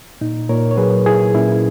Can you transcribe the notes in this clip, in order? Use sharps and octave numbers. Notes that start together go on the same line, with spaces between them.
A#2 D#4
A#2 A#4 C#5
C#5
F#3 G#4 B4
A#2 E4 G#4
A#2 C#4 E4